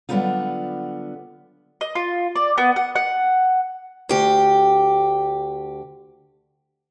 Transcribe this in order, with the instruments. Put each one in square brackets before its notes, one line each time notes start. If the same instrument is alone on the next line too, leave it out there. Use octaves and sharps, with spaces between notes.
[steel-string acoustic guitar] D3 F#3 G3 B3 D#4 F4
[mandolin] D#5
F4
D5
B3
F#5
F#5
[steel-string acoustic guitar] D2 G4